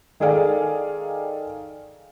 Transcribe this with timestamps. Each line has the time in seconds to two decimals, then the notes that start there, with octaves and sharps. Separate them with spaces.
0.20 D#3 G#4 A4 D5 F5 G#5